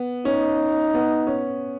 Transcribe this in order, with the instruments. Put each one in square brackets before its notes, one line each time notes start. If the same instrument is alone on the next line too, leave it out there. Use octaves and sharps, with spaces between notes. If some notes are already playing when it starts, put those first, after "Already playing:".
Already playing: [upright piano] B3
[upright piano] C#4 [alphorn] D#4
[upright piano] B3
C#4